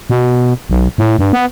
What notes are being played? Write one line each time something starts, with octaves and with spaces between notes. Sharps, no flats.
B2
B1
A2
G2
B3